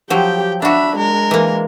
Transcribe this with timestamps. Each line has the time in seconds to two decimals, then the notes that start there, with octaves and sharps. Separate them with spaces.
0.10 F3 F#3 G4 G5
0.62 D4 F#4 E5 B5
0.97 G#3 A#4
1.31 E3 A#3